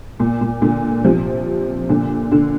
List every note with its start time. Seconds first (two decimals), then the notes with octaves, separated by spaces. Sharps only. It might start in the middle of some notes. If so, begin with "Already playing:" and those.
0.20 A#2
0.41 A#2
0.62 A#2 D3
1.04 C3 F3
1.89 A#2 D3
2.31 A#2 D3